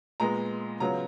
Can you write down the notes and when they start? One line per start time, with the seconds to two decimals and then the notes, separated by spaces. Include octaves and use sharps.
0.20 A#2 G#3 B3 A#5
0.80 C#3 F#3 B3 F4 A#5